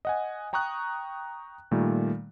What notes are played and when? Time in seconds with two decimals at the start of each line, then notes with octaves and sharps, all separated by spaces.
0.05 D#5 F#5 G#5
0.53 G5 A#5 C#6 D#6 F#6
1.71 A#2 D#3 G3 A3